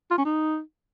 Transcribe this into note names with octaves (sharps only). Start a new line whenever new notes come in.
F4
C#4
D#4